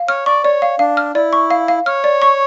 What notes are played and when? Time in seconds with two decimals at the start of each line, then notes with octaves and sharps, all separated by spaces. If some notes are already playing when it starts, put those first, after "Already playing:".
Already playing: F5
0.08 C#5 F6
0.26 D5 C#6
0.44 C#5 D5
0.62 F5
0.79 D4 F5
0.97 F6
1.15 E4 D5
1.33 C#6
1.50 F5
1.68 F5
1.86 C#5 F6
2.04 D5
2.22 C#6